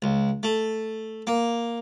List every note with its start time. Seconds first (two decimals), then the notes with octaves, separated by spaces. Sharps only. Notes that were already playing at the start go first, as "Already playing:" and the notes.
0.02 C#2
0.43 A3
1.27 A#3